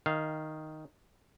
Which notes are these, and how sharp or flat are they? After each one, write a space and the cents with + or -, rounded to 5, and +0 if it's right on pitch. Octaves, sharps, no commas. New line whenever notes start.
D#3 +0 F5 -10